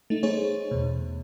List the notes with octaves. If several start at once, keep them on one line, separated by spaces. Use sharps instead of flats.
A3 D#4
A3 D#4 G#4 C5 C#5
E2 B2